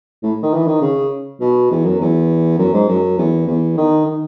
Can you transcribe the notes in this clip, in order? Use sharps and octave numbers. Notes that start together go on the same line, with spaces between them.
A2
D#3
E3
D#3
C#3
B2
E2
F#2
E2
F#2
G#2
F#2
E2
E2
D#3
D#3